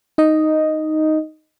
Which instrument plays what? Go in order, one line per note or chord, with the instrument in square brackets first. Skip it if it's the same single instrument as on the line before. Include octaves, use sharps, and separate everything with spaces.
[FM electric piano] D#4 D#5